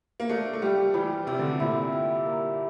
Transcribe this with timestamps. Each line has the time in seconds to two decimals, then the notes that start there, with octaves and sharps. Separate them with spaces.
0.20 A#3
0.29 A3 D4
0.53 A3
0.62 G3 G4
0.94 E3 G3
1.27 C3 D5
1.39 D3
1.50 C3
1.60 A#2 E4
1.92 G4
2.26 A#3